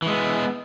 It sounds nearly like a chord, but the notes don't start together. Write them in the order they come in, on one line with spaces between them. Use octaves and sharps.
E3 G#3 B3